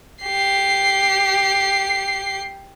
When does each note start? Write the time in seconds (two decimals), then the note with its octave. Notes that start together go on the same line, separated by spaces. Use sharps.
0.22 G4 C7